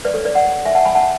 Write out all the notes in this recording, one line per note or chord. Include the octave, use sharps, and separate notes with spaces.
B4 D5
A4 C#5
B4 D5
D5 F#5
E5 G#5
F#5 A5
G#5 B5
F#5 A5